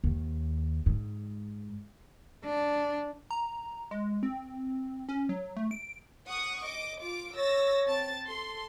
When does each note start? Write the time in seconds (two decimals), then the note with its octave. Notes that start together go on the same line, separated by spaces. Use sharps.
0.04 D#2
0.86 G#2
2.45 D4
3.31 A#5
3.91 G#3
4.23 C4
5.09 C#4
5.29 F#3
5.57 A3
5.71 D7
6.27 F#5 C#6 D#6
6.64 D#5 D6
7.01 F4 D6
7.36 C#5 E6 A6 A#6
7.88 C4 A5 A6
8.27 A4 C6